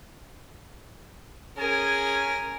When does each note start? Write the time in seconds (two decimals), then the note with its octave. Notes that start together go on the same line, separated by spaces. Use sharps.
1.57 C#4 G#4 A#4 G#5